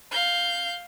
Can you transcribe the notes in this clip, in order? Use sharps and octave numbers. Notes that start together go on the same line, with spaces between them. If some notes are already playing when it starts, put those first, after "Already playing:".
F5 G6